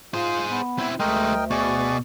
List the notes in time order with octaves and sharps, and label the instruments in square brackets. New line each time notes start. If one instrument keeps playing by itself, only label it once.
[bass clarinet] F4 [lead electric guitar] G#4 C5
[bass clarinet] B3
[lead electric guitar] C4 E4
[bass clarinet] D2 [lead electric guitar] G#3 A3 [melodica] A#4 D#5 G5
[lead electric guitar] B2 [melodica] G#4 D5 C#6